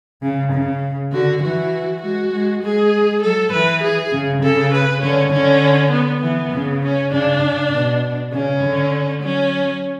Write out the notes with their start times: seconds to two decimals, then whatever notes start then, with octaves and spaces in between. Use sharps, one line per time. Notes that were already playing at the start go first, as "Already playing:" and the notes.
0.22 C#3
0.52 C#3
1.13 D3 F#4
1.42 E3 F#4
2.02 G#3 F#4
2.32 G#3
2.63 G#3 G#4
3.23 F#3 A4
3.53 E3 B4
3.83 G#4
4.13 C#3
4.42 C#3 A4
4.73 B4
5.02 D3 C#4
5.32 D3 C#4
5.92 B3
6.22 E3 B3
6.53 C#3
6.83 C#4
7.12 C#3 D4
7.42 C#3
7.72 B2
8.33 C#3 C#4
8.63 D3
9.22 F#3 C#4